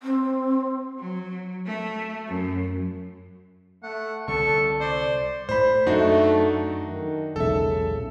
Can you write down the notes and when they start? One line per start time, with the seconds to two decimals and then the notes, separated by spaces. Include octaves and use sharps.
0.02 C4
0.99 F#3
1.66 A3
2.28 F#2
3.83 A3 F#5
4.28 C2 D3 G3 A4 C#6
4.80 C5 D5
5.49 A2 A3 C5 B5
5.87 F#2 A3 D4 D#4 F#4
6.84 D#3
7.36 E1 B1 A#2 C#3 A4 E5